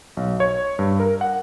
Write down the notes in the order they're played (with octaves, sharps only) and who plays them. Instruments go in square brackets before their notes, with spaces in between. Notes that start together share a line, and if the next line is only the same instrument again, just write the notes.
[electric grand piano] B1
C#5
G2
A#4
F#5